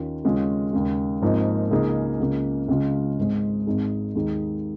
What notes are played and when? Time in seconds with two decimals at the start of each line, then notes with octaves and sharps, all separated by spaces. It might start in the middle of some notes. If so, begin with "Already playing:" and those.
Already playing: D#2 D#3 C#4 F4
0.24 D#2 C#3 G#3 C#4 F4
0.73 D#2 C#3 G#3
1.22 G#1 G#2 F3 A#3 D#4
1.71 C#2 C#3 A#3 D#4 G#4
2.20 C#2 C#3 A#3
2.68 C#2 C#3 G#3 F4
3.18 G#1 G#2 G#3
3.67 G#1 G#2 G#3 D#4 G#4
4.15 D#2 D#3 G#3 D#4 G#4